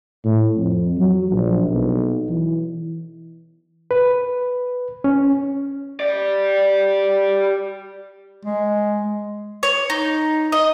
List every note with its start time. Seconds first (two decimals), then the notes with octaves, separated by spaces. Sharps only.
0.25 A2
0.57 F2
0.98 F#3
1.31 A#1
1.69 B1
2.29 E3
3.91 B4
5.04 C#4
6.00 G4 D5
8.45 G#3
9.63 C#5
9.90 D#4
10.52 D#5